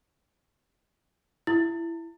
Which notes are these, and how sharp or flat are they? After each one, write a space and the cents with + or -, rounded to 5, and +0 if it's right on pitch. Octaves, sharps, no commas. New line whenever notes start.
E4 +20